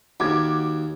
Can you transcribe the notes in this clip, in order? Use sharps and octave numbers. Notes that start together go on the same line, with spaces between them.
D#2 F#4 D6 G#6